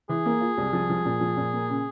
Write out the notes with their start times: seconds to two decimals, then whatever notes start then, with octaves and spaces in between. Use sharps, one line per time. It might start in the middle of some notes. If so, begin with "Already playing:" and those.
0.09 E3 G#4
0.26 A#3
0.41 F4
0.57 C2
0.73 F3
0.90 F3
1.05 A#2
1.20 F3
1.37 A#2
1.53 A#3
1.69 C#3